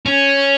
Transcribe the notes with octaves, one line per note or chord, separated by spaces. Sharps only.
C#4